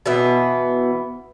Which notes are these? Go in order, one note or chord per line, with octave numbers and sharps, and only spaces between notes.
B2 E3 B3